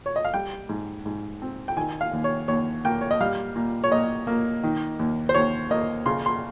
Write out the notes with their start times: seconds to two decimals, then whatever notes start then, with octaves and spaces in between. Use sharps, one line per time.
0.06 C#5
0.16 D#5
0.25 F5
0.34 G3 G5
0.69 G#2
1.06 G#2
1.42 C4
1.68 G5
1.77 D#3 G#5
2.01 F5
2.13 D#2
2.24 C#5
2.48 D#2 C#5
2.85 A#3 G5
3.01 C#5
3.11 D#5
3.20 G3 F5
3.56 A#2
3.84 C#5
3.91 A#2 D#5
4.27 A#3
4.63 D#3
4.99 D#2
5.29 C5
5.34 D#2 C#5
5.71 A#3 D#5
6.06 C#3 C6
6.26 C6